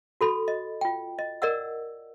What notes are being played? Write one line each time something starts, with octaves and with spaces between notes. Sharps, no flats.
F#4 A4 B5
D#5
F4 G5
D#5
A#4 D5 D#5 F#5 E6